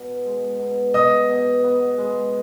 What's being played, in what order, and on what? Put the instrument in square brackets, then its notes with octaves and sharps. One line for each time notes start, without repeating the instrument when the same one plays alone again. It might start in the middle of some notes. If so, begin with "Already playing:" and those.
Already playing: [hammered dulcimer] B2
G#3
B2
[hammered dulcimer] B3 [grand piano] D#5 D#6
[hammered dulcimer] B2
B3
G#3